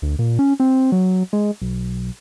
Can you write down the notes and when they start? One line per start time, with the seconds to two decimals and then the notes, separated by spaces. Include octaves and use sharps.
0.02 D2
0.19 A#2
0.39 C#4
0.60 C4
0.92 F#3
1.33 G#3
1.62 B1